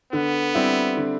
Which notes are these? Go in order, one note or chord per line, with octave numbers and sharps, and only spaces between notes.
D3 B3
G3 C4 E4
D3